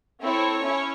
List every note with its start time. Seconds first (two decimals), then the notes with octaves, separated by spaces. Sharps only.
0.21 C4 E4 A4 C#5
0.62 C#4 E4